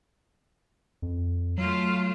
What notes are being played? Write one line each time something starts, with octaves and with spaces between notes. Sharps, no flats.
F2
F#3 A3 F4